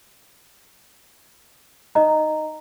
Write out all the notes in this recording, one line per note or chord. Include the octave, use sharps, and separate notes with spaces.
D#4 D#5 A#5